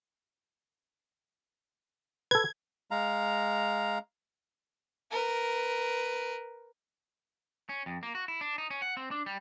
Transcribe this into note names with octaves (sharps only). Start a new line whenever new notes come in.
A4 B4 G#6
G#3 F5 A#5
A#4 B4
C#4
F2
A#3
F#4
E4
D4
D#4
C#4
F#5
C4
D4
G3